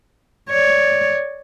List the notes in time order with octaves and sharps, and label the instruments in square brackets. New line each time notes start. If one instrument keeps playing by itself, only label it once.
[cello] C#5 D5